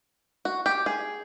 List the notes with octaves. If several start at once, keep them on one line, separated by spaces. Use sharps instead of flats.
F#4
G4
G#4